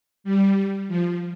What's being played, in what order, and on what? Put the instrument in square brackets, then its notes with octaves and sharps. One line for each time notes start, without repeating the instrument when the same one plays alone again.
[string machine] G3
F3